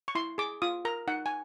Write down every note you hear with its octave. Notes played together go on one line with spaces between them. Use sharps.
C#6
E4 C6
G#4 D6
F4 D#6
A#4 A#5
D#4 F#5
G#5